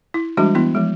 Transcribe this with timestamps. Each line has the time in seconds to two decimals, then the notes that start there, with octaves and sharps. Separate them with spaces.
0.14 E4
0.37 E3 G3 G#3 D4 F#4
0.55 E3 B3 E4
0.75 F3 G#3